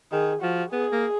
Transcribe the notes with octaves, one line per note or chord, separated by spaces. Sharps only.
D#3 G#4
F3 F#4
B3 G#4
A#3